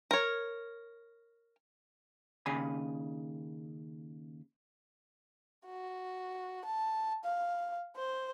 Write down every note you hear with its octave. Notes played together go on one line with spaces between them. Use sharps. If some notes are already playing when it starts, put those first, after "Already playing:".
A#4 C#5
D#2 C#3 G#5 B5
F#4
A5
F5
C5